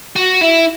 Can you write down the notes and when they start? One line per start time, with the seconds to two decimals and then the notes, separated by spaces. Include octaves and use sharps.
0.16 F#4
0.41 E4